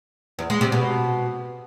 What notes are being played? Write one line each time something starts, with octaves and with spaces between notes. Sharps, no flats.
E2
G#3
C3
B2